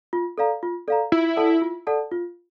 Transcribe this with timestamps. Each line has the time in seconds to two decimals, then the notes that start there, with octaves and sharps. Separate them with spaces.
0.13 F4
0.38 A4 D5 F5 A#5
0.63 F4
0.88 A4 D5 F5 A#5
1.12 E4 F4
1.37 A4 D5 F#5 A5
1.62 F4
1.87 A4 D5 F#5 A5
2.11 F4